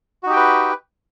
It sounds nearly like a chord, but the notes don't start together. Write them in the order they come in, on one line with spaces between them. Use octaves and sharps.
F#4 D#4 G4 G5 B4